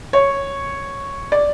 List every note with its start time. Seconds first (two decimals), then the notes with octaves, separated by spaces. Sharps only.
0.13 C#5
1.32 D5